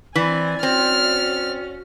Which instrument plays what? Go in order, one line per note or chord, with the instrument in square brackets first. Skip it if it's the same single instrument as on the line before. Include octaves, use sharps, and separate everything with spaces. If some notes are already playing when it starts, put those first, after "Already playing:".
[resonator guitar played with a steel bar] E3 [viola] C4 G#5 [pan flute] D5
[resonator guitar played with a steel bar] C4 [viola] C#4 F#4 [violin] F6